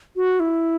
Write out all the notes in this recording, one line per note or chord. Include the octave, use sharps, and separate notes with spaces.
F#4
E4